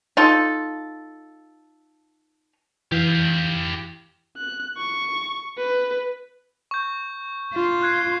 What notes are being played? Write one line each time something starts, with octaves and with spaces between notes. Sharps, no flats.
D#4 F4 A4
E3 G4 F5
F#6
C#6
B4
C#6 G6
F4
F#6 G#6 C7